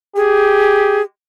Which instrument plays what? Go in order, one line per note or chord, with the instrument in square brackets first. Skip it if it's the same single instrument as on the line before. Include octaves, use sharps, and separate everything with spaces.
[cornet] G4 [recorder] G#4